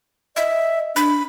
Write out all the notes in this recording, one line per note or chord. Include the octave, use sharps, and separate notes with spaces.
D#5 E5
D4 B5